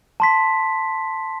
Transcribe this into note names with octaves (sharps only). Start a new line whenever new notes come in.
A5 C6 B6